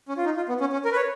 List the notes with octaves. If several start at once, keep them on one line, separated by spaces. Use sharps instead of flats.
C#4
F4
D#4
F4
B3
C#4
C#4
A#4
B4
C#5